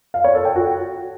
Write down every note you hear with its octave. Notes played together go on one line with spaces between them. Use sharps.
F5
C#5
A4
G5
F#4